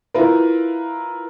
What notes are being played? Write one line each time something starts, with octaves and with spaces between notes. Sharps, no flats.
E4 F4 A#4 B4